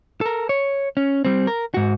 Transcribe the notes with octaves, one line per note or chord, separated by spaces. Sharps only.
A4 A#4
C#5
C#4
G3 C4
A#4
G#2 F#4